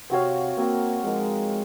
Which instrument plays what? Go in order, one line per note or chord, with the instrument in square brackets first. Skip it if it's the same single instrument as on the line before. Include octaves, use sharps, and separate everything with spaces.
[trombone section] C3 [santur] C4 F#4 C#5 F5
[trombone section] A#3 [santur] C4 F#4 C#5 F5
[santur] F3 A#3 D#4 A#4 [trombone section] G#3